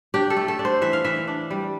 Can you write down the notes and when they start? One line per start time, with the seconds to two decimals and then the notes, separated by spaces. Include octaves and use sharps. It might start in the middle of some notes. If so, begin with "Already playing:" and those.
0.14 D4 G4
0.30 A4
0.37 A3
0.48 A4
0.59 D4
0.65 C5
0.82 E3 E5
0.93 F5
1.05 E3 E5
1.28 D4
1.51 G3